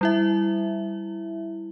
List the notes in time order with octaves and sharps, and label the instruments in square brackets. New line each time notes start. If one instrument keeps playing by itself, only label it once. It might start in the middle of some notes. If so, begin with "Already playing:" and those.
[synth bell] G3 E4 E5